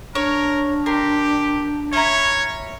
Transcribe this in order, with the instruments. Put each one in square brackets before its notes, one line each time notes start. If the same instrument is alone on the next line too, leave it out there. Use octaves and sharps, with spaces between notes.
[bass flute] D4 [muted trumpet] A#4 [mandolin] C#5
[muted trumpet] G4 [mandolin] A#4 C6
[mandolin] C#4 E4 A#5 [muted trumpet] C#5